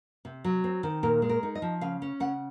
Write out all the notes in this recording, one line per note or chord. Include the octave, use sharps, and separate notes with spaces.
C3
F#3
C4
D#3
A#2 A#4
G#3
A#4
D#4
D#5
F3
C#3 F5
C#4
C#3 F#5